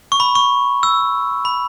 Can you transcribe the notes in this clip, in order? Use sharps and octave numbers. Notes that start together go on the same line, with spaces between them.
C#6
B5
C#6
E6
B5